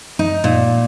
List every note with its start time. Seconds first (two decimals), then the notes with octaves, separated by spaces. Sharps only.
0.19 D#4
0.44 A#2